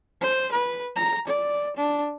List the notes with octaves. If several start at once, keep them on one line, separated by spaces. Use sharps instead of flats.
C5
B4
A#5
D5
D4